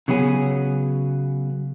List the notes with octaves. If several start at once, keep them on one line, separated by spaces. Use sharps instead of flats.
C#3 F#3 B3 G#4